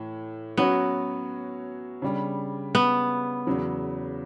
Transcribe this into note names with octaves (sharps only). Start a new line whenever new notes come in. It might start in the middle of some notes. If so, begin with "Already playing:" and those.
Already playing: A2 E3
F#3 B3 C#4 F#4 C#5
C#3 G3 D4
B3
E2 C#3 F#3